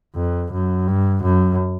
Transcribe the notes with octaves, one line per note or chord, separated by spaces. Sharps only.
F2
F#2
G2
F#2